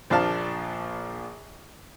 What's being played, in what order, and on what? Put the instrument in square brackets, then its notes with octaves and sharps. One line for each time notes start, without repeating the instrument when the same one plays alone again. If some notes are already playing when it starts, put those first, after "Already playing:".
[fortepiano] A#1 F3 D4 F5 A5